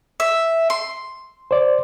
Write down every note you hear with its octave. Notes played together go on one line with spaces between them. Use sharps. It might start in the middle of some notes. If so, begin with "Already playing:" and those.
E5
C6
C5 D5